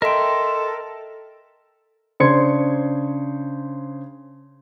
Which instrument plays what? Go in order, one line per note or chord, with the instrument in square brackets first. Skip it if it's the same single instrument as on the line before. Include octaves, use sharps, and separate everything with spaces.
[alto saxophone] A4 [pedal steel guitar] A#4 E5 G5 [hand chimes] D#5 C6
[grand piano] C#3 D4 C5 C6 G#6 C#7